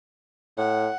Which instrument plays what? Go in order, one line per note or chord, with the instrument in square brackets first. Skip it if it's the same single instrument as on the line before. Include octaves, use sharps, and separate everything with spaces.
[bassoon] A2 [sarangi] F#5